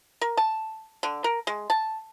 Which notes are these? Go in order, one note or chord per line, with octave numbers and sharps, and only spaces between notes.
A#4
A5
D3
A#4
G#3
A5